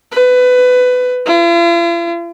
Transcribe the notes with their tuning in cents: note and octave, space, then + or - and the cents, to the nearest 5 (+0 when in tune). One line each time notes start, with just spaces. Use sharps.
B4 +20
F4 -45